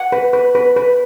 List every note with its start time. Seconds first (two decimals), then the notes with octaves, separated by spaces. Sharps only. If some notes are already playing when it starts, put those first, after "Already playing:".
Already playing: F#5
0.12 B4
0.33 B4
0.55 B4
0.76 B4